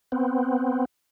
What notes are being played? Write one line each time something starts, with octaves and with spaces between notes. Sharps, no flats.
B3 C4